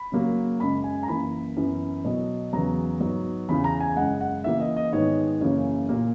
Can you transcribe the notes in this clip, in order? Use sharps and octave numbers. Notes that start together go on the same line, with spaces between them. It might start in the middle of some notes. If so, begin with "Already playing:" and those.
Already playing: B5
C#3 F#3 A#3
F#2 C#3 G#3 B5
G#5
A#5
F#2 E3 A#3 B5
F#2 E3 B3
B2 F#3 B3
E2 C#3 F#3 B3 A#5
G#2 F#3 B3
E2 C#3 E3 B5
A#5
G#5
F#2 C#3 G#3 F#5
F#5
C#3 E3 A#3 E5
D#5
D#5
G#2 D#3 G#3 B3 C#5
F#2 C#3 E3 A#3 C#5
A#2 A#3